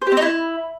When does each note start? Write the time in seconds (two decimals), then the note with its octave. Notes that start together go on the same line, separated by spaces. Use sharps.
0.02 C5
0.07 G4
0.12 C4
0.17 D#4
0.22 E4